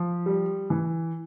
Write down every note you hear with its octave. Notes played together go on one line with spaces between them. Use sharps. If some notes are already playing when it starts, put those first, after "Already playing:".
Already playing: F3
G3
E3